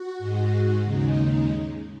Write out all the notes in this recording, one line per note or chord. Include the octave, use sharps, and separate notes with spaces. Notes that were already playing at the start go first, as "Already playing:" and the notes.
Already playing: F#4
G#2 G#3
D#2 C#3 G#3 D#4